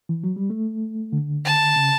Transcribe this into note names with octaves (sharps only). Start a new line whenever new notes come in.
E3
F#3
G3
A3
D3
A5
C#3